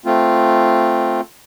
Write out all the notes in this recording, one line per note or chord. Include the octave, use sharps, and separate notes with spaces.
A3 C4 F4